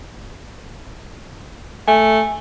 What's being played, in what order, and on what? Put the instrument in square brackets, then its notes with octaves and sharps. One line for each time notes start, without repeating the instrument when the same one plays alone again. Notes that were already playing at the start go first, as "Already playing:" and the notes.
[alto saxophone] A3 [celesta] G#5